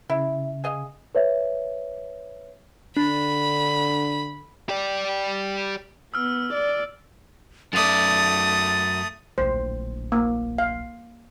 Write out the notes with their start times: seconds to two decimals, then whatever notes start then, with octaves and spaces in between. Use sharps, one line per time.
0.10 C#3 E4
0.64 G#4 D#5 F5
1.15 B4 C#5 E5
2.97 D3 D4 B5
4.69 G4 D5
6.14 B3 E6 F6
6.54 D5
7.73 F#2 A3 D5 D#6 A6
9.38 D1 A#1 C5
10.12 A#3
10.58 F5